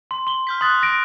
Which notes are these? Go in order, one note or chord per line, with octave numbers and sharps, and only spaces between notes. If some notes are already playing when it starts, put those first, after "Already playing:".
C6
C6 G7
F6 G6 B6
C6 D#6 F#6 A6
A#6 D7